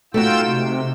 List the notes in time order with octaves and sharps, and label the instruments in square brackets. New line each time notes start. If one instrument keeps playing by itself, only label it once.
[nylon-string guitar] A3 D#4 F#4 [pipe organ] F4 G5 E6
[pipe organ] C3